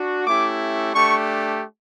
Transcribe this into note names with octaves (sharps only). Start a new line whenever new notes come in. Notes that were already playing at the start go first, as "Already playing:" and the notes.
Already playing: D4 F#4
A3 C#4 E4 G4 D6
A3 D4 G4 C#6